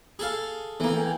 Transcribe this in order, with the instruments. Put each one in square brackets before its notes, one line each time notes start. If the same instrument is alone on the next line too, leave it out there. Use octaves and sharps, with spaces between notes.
[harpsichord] G#4 A4 F5
[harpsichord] E3 A#3 [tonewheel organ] B3 A4
[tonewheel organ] G5 G#5